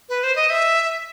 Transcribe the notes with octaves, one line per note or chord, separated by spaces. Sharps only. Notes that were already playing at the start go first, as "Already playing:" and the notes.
B4
C5
D#5
E5